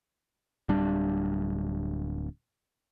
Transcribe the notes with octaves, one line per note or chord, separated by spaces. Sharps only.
D1 G3 D4